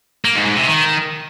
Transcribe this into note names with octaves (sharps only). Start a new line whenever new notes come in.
A#3
G#2
G#2
C3
D#3